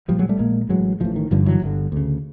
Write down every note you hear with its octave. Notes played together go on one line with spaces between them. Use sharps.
A#1 A#2 F3 G3
F#3 G#3
G3 A3
A#1 A#2 G#3 A#3
A1 A2 F#3 G#3
A1 A2 D#3 F3
D#3
G1 G2 D3 F3
E3 F#3
G1 G2 D3
D2 C#3